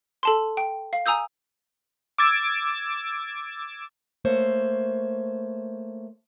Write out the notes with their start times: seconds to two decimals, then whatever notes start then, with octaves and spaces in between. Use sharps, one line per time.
0.23 A4 A5 C6
0.57 G5
0.93 F5
1.06 G#5 A#5 D#6 E6 G6
2.18 D6 E6 G#6 A6 D7
4.25 A3 A#3 C5 C#5